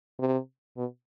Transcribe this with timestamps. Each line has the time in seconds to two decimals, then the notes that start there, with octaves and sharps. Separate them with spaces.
0.20 C3
0.77 B2